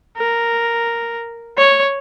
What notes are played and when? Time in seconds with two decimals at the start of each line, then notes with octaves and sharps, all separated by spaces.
0.17 A#4
1.58 C#5